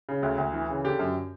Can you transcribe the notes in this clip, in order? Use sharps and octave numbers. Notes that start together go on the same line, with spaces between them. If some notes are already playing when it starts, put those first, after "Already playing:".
C#3
D2
D2
E3
C#3
D3 G4
F#2